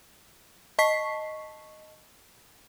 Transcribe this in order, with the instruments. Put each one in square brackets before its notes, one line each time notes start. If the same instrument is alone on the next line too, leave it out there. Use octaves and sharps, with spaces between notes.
[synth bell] D#5 A5 C#6 B6 C7